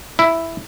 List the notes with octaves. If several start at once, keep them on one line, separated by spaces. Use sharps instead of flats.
E4